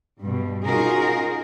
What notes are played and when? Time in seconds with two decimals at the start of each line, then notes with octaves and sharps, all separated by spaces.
0.21 G2 B2
0.66 C#4 D#4 F4 F#4 G#4 A#4